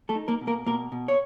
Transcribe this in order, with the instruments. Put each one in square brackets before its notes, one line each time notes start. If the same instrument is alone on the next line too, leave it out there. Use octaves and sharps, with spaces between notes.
[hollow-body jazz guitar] A3 A4
D#4
A#3 A#4
B2
A#3 A#4
B2 A#3 A#4
B2
C#5